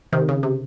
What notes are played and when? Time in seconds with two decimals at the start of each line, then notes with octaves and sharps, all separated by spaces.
0.12 C3 D#3
0.29 C#3
0.43 C3